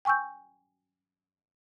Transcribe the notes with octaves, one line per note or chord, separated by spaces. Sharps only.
G5 G#5 C#6 E6 G6